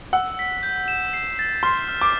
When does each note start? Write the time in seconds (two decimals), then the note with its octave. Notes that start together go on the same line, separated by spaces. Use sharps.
0.13 F#5 E6
0.39 B6
0.63 G6
0.88 E7
1.14 C7
1.39 A6
1.63 C6 F6
1.88 F6
2.01 D6